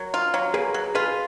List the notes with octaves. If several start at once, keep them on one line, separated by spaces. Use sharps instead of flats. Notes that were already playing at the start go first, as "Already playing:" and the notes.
Already playing: F#3 A#4
F4
F#3
A#3 G#4 B4
F#3
F4 G#4 B4